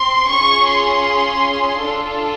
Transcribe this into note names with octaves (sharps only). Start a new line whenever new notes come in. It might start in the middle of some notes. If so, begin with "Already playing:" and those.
Already playing: C4 C6
C#4 F4 G#4 C#6
C6
D4 F4 A4